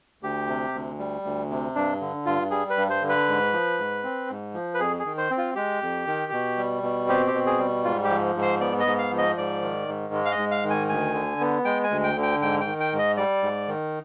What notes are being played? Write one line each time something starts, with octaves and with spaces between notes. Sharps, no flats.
D2 G4
C3
D2
G3
D2
C3
G2 D4
D3
G2 F4
G3 G#4
B4
G2
C5
D3
B4
G#2
F3
G#2
C4
G#2
F3
B4
F2 G#4
G#4
D#3
C5
C4
F4
G#3 G4
F2
D#3
B2
G3
B2
C4 G4
G4
B2
G#4
G3
G#2 F4
G4
F3
G#2
C5
B3 D5
D#5
G#2
F5
F3
D#5
G#2 D5
D#3
G#2
G#3
F5
D#5
G#2
F5
D#3
G#5
D2 G#5
D3
B3
G#3 G5
G#5
D2
G5
D3
G5
G#2 G5
G5
D#3
G5
G#2
D#5
G3 D5
G#2
D#3